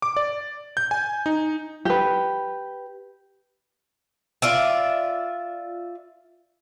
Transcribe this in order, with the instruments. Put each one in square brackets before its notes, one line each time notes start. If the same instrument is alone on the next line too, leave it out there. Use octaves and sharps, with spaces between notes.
[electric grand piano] D6
D5
G6
G#5
D#4
[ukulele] G4 B4
[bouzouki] F4 D5 E5